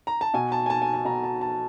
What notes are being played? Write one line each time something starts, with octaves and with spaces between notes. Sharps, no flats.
A#5
A5
B2 G#5
A5
G#5
A5
G#5
A5
B2 A#5
A5
A5